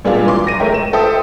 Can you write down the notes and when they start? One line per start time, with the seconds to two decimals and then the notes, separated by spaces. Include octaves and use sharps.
0.05 A#2 G3 G#3 D4 F4
0.26 E3 F#3 C6 D6
0.47 A#6 D#7
0.60 G#3 A3 A#4 C#5 E5 G5
0.74 E7
0.93 A4 C5 E5 G5 D#6